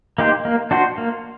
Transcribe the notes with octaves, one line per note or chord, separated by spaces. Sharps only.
A#3 D#4 G4 C5
A#3
D4 F#4 C5
A#3